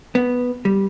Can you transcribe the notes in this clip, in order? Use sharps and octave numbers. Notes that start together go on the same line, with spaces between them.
B3
G3